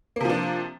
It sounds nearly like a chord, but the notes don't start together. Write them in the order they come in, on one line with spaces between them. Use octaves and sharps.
A#3 C3 F3 D4